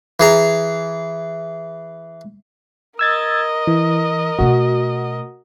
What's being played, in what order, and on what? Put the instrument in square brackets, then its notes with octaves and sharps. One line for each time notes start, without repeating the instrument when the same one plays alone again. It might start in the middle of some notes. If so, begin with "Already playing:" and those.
[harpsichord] E3 G#4 A#5
[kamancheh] A#4 D#5 [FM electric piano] E6 G#6 A6
[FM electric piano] E3
[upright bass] B2 A3 [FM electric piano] F#4